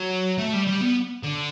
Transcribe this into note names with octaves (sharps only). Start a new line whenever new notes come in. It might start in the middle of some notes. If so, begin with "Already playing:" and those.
Already playing: F#3
A3
G3
G3
B3
D3